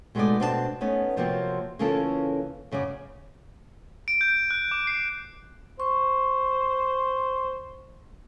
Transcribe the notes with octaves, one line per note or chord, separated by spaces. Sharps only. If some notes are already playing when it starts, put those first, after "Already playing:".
B2 G#3 A3 B3 D#4 D5
B2 C4 D4 D#5 A5
A3 B3 C#4 D#4
C3 F3 F#3 A#3 C4
C#3 E3 A#3 C#4 F4 A4
F#2 C#3 C#5 D5
D7
G6
F#6
D6
C7
C5 C#6